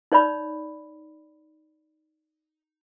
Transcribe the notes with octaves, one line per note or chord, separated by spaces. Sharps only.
D#4 C#5 D5 B5